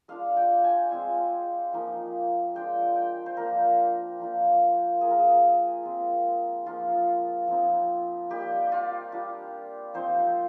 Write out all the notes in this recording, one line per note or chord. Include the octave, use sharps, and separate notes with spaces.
G#3 D4 F4 F5
G5
G#5
G#3 C4 F4
F3 A#3 D#4
G#3 D4 F4 G5
G5
C5
F3 A#3 D4 A#4
F3 A#3 D4 F4
A#3 F4 G#4
A#4
G#4
G#3 C4 F4
F3 A#3 D#4 F4
F3 C4 D#4
G3 A#3 D#4 G4
F4
G3 D4 F4
F3 C4 D#4 C5